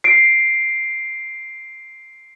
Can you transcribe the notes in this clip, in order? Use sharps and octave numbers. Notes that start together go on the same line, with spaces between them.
C7 D7